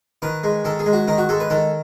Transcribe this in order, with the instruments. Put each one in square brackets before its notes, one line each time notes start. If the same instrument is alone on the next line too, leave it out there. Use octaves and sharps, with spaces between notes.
[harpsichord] D#3 B4
G#3
D#3 A4
G#4
G#3
F#4
D#3 D#4
F#4
G#3 A4
B4
D#3 A4